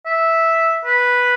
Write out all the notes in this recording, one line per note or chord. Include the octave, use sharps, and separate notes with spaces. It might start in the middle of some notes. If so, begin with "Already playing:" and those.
E5
B4